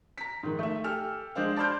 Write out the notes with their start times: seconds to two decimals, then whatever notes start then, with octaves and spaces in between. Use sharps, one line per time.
0.18 A#5 B6
0.43 G#2 D#3
0.59 A3 E5
0.84 G4 A4 G#5 F6
1.35 G#3 D4 C5 F5
1.56 D5 A5 B5 C6 F6 G6